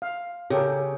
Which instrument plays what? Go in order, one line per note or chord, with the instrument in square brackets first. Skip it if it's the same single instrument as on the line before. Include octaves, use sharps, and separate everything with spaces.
[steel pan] F5
[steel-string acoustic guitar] C#3 [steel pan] G4 A4 A#4